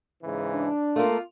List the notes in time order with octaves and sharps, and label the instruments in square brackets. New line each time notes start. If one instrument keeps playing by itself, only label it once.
[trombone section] G#2 C#3 E3
[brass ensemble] D4
[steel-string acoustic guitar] A3 A#3 [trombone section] F4